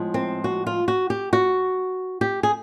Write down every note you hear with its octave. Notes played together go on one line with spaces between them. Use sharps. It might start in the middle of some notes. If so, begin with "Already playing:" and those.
Already playing: A2 F3 G#3 B3
C4
F#4
F4
F#4
G4
F#4
G4
G#4